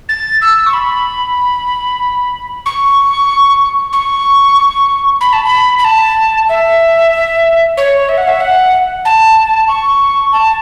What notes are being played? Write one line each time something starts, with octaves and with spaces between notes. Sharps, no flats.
A6
E6
C#6
B5
C#6
C#6
B5
A5
B5
B5
A5
E5
C#5
E5
F#5
E5
F#5
A5
C#6
A5